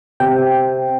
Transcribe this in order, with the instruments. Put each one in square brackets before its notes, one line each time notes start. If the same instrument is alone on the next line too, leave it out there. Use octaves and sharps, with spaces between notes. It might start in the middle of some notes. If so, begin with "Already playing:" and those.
[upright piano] C3 [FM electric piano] G5